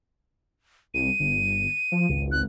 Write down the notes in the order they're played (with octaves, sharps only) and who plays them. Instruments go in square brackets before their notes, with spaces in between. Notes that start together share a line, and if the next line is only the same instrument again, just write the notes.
[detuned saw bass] C2 [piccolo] D#7
[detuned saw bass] G1
F3
[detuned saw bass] G#1 [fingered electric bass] C#2
[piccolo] F#6